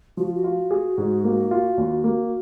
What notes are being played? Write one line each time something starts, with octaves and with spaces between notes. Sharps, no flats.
F3 F#4
F4
F#4
F4
G#4
G#2
A#3
F4
D#2
A#3